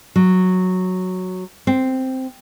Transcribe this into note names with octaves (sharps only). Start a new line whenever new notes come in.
F#3
C4